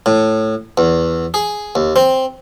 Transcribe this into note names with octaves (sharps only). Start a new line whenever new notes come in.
A2
E2
G#4
D#2
C4